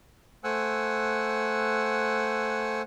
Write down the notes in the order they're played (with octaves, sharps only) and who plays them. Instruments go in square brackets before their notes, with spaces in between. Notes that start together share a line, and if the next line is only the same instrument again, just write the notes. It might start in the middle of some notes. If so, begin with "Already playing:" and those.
[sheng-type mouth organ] A3 C5 F#5 G#5 E6 F#6